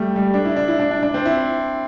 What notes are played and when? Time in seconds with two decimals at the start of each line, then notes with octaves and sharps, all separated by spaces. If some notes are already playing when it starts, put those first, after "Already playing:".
Already playing: G3 A3
0.16 G3
0.34 D4
0.45 E4
0.56 D4
0.68 E4
0.80 D4
0.91 D4
1.03 D4
1.14 C4
1.26 E4